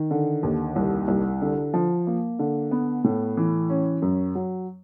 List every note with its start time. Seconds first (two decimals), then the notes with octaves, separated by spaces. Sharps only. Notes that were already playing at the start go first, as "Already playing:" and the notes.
Already playing: D#3
0.11 D3
0.43 D#2
0.76 C2
1.08 C2
1.42 D3
1.74 F3
2.07 A#3
2.39 D3
2.71 B3
3.04 A2
3.37 E3
3.69 C#4
4.02 F#2
4.35 F#3